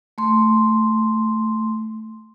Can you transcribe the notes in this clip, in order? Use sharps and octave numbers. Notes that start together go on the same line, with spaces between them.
A3 C6